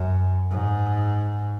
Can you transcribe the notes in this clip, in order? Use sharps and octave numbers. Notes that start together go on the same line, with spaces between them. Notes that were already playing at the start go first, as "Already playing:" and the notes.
Already playing: F#2
G#2